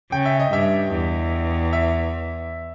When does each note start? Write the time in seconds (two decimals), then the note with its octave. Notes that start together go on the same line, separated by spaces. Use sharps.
0.11 C#3 G5
0.25 E5
0.40 D#5
0.52 G2 E5
0.92 E2
1.73 E5